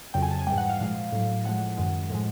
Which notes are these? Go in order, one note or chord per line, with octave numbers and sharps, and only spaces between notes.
F2 C#3 F#3 G5
G#5
A5
G#5
G#2 E3 G3 G5
F#5
F5
A#2 F3 G#3 F5
A2 F#3
A2 F3 G#3 F#5
F#2 D#3 G#3
A2 F3 G#3